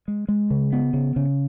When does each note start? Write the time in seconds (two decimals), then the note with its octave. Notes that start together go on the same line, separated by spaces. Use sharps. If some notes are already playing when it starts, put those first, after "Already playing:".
0.08 G#3
0.28 G#3
0.50 C#3
0.73 B3
0.94 C#3
1.16 C#3